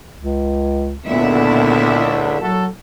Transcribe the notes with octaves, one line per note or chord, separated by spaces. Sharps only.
C#2
C#2 A#2 D3 B3 E4 E5
F#3 F#4 A4